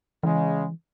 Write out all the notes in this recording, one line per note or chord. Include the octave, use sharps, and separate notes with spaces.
C#3 E3 G#3